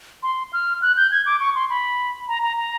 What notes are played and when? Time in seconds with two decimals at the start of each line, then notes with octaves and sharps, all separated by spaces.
0.23 C6
0.53 F6
0.82 F#6
0.97 G6
1.11 G#6
1.26 D6
1.40 C#6
1.55 C6
1.70 B5
2.28 A#5
2.43 A#5
2.57 A#5